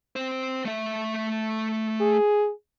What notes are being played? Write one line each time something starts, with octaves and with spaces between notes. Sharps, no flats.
C4 C5
A3 E5
G#4